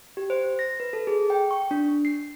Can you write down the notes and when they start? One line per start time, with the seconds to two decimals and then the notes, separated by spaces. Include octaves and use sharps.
0.17 G4
0.30 C5
0.59 A#6
0.80 B4
0.93 A4
1.07 G#4
1.30 G5
1.51 C#6
1.71 D4
2.05 C7